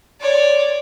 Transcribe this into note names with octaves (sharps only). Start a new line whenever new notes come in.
C#5 D5